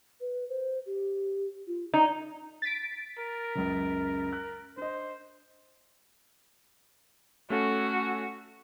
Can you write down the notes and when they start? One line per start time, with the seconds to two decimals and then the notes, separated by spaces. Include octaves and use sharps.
0.21 B4
0.49 C5
0.86 G4
1.67 F4
1.94 D#4 D5
2.62 A6 B6 D7
3.19 A#4
3.55 C#2 F#2 C#3
4.33 F#6
4.77 D4 C5 D#5
7.50 A3 C#4 F#4 A4